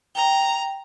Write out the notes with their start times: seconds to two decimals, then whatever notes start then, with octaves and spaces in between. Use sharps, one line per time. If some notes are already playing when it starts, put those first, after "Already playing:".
0.15 G5 A#5